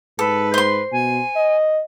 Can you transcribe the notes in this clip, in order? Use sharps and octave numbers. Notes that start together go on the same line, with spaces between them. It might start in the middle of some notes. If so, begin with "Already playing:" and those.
G#2 A4 B4
C5 C6
B2 G#5
D#5